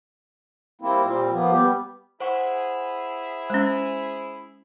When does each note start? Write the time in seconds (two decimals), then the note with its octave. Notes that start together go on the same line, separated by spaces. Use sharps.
0.81 G3 A#3 C4 E4
1.03 A#2 G3 C4
1.31 F3 A#3 B3
1.51 G3 B3 G4
2.20 E4 G#4 C5 F#5 C#6
3.50 G#3 C#4 C5